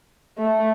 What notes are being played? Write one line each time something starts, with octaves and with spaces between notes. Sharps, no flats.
A3